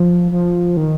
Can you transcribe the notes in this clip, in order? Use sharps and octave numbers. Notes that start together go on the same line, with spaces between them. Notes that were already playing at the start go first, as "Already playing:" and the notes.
Already playing: F3
F3
D#3